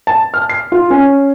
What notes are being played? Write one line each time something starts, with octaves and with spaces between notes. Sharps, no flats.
A5
F6
C7
F4
C#4